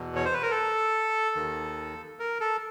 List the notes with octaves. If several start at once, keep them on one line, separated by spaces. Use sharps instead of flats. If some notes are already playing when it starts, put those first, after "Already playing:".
Already playing: E2 B2
C#5
C5
B4
A#4
A4
D#2 D#3
A#4
A4